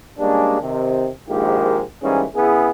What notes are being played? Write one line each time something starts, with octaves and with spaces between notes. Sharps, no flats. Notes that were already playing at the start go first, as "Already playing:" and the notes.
G3 G#3 A#3 C#4 D4
C3 D#3
A#1 G#2 D#3 G#3 A#3 G4
G#2 E3 G3 A#3 C#4
C#3 B3 E4 G#4